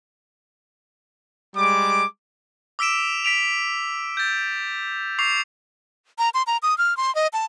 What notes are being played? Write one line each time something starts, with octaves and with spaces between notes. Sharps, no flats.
G3 G#3 D6
D6 E6 B6 D7 E7
B6 D7 F7
G6 A6
C#6 D6 C7 F7
A#5
C6
A#5
D#6
F6
C6
D#5
A5